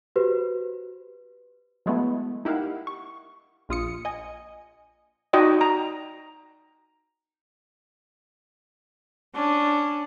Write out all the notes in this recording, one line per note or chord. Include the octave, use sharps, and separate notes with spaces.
F#4 G4 B4 C5
F#3 G#3 A3 B3 E4
D#4 E4 G4 A#4 F5 F#5
C#6
A#1 F4 D#6 C#7
D#5 G#5
D#4 F#4 D5 D#5 G5
A#5
C#4 D4